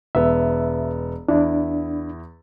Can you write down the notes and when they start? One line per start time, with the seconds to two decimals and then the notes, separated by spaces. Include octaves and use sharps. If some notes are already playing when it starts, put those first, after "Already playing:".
0.15 E1 B3 E5
1.28 E2 D4 E4